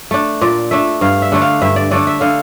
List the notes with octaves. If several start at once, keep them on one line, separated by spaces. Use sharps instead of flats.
A3 D4
A#2 D5
A3 D4 E5
G2 F5
E5
D3 A3 D4
F5
G2 E5
D5
D3 A3 D4 D5
E5
D3 F5